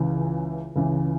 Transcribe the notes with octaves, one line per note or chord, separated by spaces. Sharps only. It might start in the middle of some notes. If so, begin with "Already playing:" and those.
Already playing: C#2 C#3 E3
C#2 C#3 E3